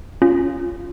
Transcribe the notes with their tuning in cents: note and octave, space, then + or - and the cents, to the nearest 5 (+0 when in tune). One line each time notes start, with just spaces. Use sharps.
C#4 +10 F4 +0